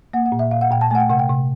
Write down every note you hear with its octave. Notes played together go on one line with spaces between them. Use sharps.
A#3 F#5
F#5
A#2
E5
A#2 F5
F#5
A#2 G5
A5
A3 F#5 G#5
G5
C3 F#5
G5
C3